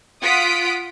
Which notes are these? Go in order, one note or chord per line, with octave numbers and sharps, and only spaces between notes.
F4 F#5 D#6 B6 D7